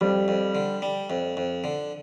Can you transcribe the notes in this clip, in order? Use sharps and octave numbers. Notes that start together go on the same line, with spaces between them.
F2 G3
F2
D3
G3
F2
F2
D3